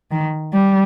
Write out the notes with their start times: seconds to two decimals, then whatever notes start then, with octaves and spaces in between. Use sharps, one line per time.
0.11 D#3
0.53 G3